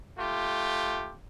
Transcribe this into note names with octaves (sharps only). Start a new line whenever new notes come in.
A3 F4 G4